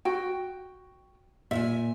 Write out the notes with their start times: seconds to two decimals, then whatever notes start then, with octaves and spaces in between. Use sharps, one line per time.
0.05 F#4 G5
1.51 A#2 C5 E5 G#5